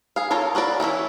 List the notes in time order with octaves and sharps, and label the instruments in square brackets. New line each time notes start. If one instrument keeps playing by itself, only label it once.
[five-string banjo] G#4 F5
F4 A4 A#4 C#5
F#4 A#4 B4 D5
E3 A3 C#4 E4